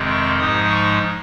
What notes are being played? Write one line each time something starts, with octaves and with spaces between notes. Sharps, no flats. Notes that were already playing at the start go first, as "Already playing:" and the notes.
Already playing: F2 C3 D#3 G#3 C4
C#6
G#2 F3 G#3 D#4 D#6
C#6